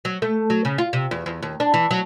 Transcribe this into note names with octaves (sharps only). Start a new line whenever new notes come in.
F#3
A3
F#3
C#3
F4
C3
E2
E2
D#2
D4
E3
F#3